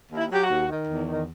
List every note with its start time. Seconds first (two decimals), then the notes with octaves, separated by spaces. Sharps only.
0.11 D#2
0.17 E4
0.30 F#3 G4
0.43 F#4
0.50 D#2
0.69 D#3
0.88 E2
1.07 D#3